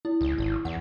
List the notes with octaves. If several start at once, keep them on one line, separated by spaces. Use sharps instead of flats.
E4
C#2
G#1
E2 F#5